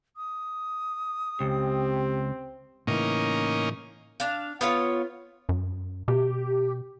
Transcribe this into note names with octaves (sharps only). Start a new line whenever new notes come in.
D#6
C#2 C4 G4
A2 C#3 E3 A#3 C#4 D#4
D4 F5
B3 F4 C#5
F#2
B2 G4